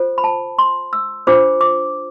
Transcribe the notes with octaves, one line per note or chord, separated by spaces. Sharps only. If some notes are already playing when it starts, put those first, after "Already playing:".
Already playing: F4 A4 C5
B5
A5
C6
E6
D4 F4 C5 D6
D6